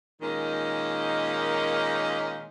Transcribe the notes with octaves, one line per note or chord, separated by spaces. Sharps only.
A#2 D#3 G#3 A#3 C#4 D#4